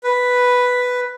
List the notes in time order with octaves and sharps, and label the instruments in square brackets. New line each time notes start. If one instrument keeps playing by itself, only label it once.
[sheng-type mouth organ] B4